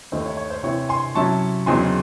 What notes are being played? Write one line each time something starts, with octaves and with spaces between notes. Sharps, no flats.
D#2 D#3 A3 D#4 C5
C#5
C#5
C5
C3 E3 C4 E4 C#5
G#5 C6
C3 F#3 C#4 E4 A5 C#6
E2 C#3 F#3 C4 D#4 G#5 C6